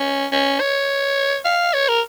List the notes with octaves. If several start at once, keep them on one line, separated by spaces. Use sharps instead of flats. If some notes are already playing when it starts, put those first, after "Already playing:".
Already playing: C#4
C#4
C#5
F5
C#5
A#4